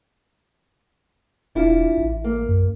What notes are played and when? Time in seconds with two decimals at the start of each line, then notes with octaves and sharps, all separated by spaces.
1.55 E1 D4 E4 F4
1.97 A1
2.24 A#3
2.48 F#2